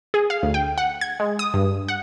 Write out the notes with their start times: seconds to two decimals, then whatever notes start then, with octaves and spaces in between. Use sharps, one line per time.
0.14 G#4
0.30 F5
0.43 D2
0.54 G5
0.78 F#5
1.01 G#6
1.20 G#3
1.39 D#6
1.54 G2
1.88 F#5